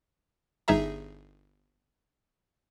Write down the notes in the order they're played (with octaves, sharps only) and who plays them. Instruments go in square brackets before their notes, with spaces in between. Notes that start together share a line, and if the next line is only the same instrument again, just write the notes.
[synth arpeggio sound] G1 D#4 G#4 E5 A#5